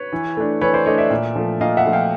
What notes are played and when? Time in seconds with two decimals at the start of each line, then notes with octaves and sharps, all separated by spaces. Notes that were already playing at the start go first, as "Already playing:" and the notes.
Already playing: B4 C#5
0.12 E3
0.37 A3 D4
0.61 E3 B4 C#5
0.74 C5 D5
0.86 A3 D4 C#5 D#5
0.98 D5 E5
1.10 A#2
1.36 F3 A3
1.61 A#2 D#5 F5
1.77 E5 F#5
1.85 F3 A3
1.93 F5 G5